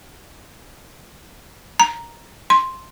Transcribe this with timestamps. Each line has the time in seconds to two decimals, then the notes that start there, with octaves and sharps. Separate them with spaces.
1.80 A#5
2.50 C6